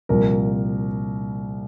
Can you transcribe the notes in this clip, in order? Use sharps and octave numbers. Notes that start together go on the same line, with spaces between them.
C2 A#2 F3 A#4